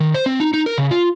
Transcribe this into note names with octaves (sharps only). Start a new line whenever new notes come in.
D#3
C5
C4
D#4
D#4
A#4
C#3
F4